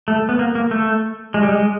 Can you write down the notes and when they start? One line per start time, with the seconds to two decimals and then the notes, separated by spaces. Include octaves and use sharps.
0.08 A3
0.29 B3
0.39 A#3
0.55 A#3
0.71 A3
1.34 G#3
1.43 G3
1.52 G#3